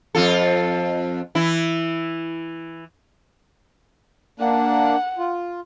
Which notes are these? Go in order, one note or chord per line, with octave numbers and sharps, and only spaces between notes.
F2 F4 A4
E3 E4
A#3 D4 F#5
F4